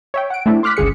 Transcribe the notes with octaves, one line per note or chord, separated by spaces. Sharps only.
C#5 E5 G5
F#5 D7
A3 C4 D4 E4 A4
C6 D6 F6 F#6 B6
G1 C#2 G#4 C#7